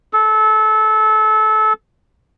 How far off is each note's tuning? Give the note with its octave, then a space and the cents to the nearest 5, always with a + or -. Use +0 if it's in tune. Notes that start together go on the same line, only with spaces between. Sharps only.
A4 -25